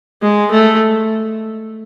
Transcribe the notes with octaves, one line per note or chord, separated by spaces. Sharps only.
G#3
A3